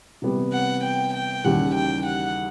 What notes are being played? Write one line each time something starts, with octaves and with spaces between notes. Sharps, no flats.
C3 E3 G3 B3
F#5
G5
G5
D#2 C#3 E3 G3 F#5
G5
F#5